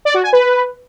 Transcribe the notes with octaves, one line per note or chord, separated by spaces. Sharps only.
D5
F#4
G#5
B4